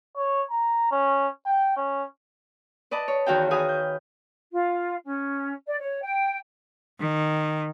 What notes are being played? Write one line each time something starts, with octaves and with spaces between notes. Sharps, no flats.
C#5
A#5
C#4
G5
C#4
B4 D5 D#5 A5
C#5
E2 D#3 F#4 F5 G5
F#4 G#4 B4 F5 G#5 D#6
G6
F4
C#4
D5
C#5
G5
D#3